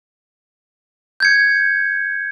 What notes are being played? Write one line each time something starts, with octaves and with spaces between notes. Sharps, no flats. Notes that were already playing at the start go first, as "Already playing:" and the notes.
G6 G#6 C#7